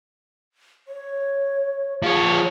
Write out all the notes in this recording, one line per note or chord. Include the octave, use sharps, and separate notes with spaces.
C#5
F3 G#4 C#5